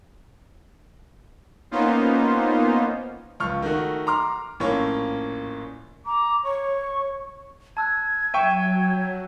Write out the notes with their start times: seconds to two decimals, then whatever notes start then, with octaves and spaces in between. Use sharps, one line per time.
1.71 A#3 B3 C#4 D#4 F4 C5
3.40 C#2 F3 C#6 F6
3.63 D#3 A3 F#4
4.07 A#5 C6 D6 F6
4.60 A#1 A2 A#3 C#4 C#5
6.05 A#5 D6
6.44 C#5 C#6
7.77 A5 E6 F#6 G#6
8.34 F#3 E5 G5 C#6 D#7 E7